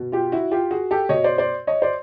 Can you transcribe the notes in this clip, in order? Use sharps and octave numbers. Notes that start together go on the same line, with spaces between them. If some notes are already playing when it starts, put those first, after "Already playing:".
Already playing: B2
F4 G4
E4 F#4
F4 G4
F#4 G#4
G4 A4
B2 C#5 D#5
C5 D5
C5 D5
C#5 D#5
C5 D5